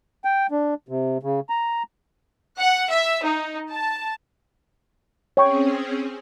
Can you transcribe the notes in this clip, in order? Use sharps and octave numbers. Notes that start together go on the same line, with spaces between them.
G5
D4
C3
C#3
A#5
F#5
E5
D#4
A5
C4 C#4 G#4 C#5 G5 C#6